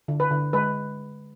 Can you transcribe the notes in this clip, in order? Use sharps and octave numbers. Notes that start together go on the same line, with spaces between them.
D3
B4
D3
G#3 B4